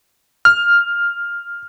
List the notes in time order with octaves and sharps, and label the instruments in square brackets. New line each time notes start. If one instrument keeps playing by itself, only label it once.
[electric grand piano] F6